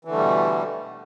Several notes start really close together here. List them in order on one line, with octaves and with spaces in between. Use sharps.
E3 D3 A3 G3 B2